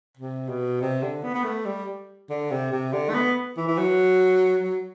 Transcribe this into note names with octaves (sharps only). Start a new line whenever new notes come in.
C3
B2
C3
D3
B3
B3
A3
G3
D3
C3
C3
D3
A3
B3
E3
E3
F#3
F#3